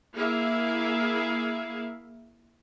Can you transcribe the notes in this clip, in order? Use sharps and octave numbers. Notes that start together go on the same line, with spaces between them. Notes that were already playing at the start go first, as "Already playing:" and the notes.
A#3 E4 G#4 A#4 E5 F5